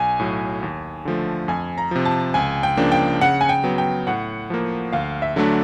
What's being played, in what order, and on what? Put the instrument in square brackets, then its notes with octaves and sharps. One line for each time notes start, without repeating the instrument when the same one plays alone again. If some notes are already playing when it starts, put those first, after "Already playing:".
Already playing: [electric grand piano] B1 [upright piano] G#5
[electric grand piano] A2 F#3
D#2
D3 F3 A3
[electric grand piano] F2 [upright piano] G#5
[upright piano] A#5
[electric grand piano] C3 F3
[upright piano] A5
[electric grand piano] C#2 [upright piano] G#5
[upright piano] G5
[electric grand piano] C#3 F3 A#3 D4
[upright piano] G5
[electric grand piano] C#3 [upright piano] F#5
[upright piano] G#5
G5
[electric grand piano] F#3 B3
[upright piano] G5
[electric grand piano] A2 [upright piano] F#5
[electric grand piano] F3 A#3
[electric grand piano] D2 [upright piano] F5
[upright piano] E5
[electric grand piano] D3 F#3 A3 D4